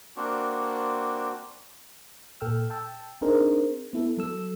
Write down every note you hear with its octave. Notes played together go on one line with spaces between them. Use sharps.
A#3 C4 D4 F#4
A#2 A4 G5 E6 F6
G5 A5 E6
C4 D4 D#4 G#4 A#4 C5
B3 E4 A4
F#3 A4 E6